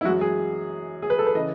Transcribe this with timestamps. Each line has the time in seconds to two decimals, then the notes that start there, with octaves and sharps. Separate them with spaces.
0.01 E4
0.04 F#2 E3 G#3 F#4
0.21 G#4
1.02 G#4
1.10 B4
1.19 A4
1.27 B4
1.35 C#3 E3 D#5